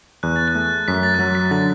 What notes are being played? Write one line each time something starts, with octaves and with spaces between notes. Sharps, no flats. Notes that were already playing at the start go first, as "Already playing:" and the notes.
E2 F#6
A6
F#6
A3
F#2 B6
A6
F#6
F#3 A6
B6
D3 A6